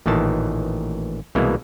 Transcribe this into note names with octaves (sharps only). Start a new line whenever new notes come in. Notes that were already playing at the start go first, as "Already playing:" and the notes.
A1 A#2 D#3 E3 A5
C2 B2 E3 G#3 A#3